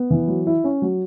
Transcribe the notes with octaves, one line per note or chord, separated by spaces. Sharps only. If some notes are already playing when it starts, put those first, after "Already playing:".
Already playing: B3
E3
F#3
E4
C#4
F#3